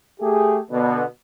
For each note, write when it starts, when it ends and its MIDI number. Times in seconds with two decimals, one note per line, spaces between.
0.20 0.58 57
0.20 0.58 67
0.20 0.58 68
0.71 1.03 47
0.71 1.03 50
0.71 1.03 59